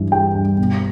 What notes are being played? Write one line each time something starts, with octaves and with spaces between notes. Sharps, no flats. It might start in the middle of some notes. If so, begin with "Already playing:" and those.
Already playing: G2 E3
G3 G5
G2
B2